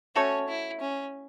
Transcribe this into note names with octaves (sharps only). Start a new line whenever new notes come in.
A3 C#4 F#4 A4 C#5
E4
C#4